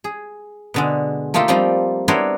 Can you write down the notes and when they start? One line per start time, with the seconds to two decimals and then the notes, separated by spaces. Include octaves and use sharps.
0.04 G#4
0.74 B2 D3 G#3
1.34 A3 A#3 D#4 F4 G4 A4
1.48 F3 G3 C4 D#4 F4
2.08 B3 D4 E4 A#4 C5 C#5